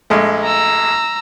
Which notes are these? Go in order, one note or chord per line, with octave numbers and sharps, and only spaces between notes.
A#1 G#3 A3
A#5 E6